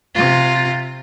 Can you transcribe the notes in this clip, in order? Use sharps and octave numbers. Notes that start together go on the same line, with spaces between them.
C3 F4